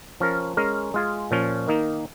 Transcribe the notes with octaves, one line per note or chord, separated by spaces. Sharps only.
F3 C#4 A#4
G#3 C#4 A#4
G#3 F4 G#4
A#2 F3 C#4
D#3 A#3 D#4